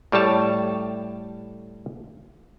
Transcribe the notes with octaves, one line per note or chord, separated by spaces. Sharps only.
A2 G3 A3 C#5 A5